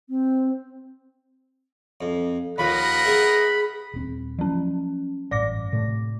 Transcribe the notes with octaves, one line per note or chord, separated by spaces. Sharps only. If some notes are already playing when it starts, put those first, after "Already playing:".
C4
F2
D#2 F3 A#4 D#5 F#5 B5
B3 G#4 E5
D#1 C4
F3 F#3 C#4
A1 G2 D5 D6 A#6
A2 C3 A3